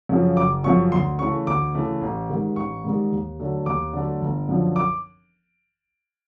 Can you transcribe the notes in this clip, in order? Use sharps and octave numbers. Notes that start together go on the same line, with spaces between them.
F#2 C#3 F3
F#1 D6
F#2 C#3 F3 C#6
D2 C6
C#3 E3 A3 C#6
D2 D6
C#3 E3 A3
A1
G#2 D#3 G3
A1 C#6
G#2 D#3 G3
D#2
D3 F#3 A3
D#2 D6
D3 F#3 A3
G1
F#2 D3 F3
D6